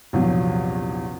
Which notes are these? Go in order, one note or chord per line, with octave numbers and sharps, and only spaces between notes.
A#1 E2 C3 F3 F#3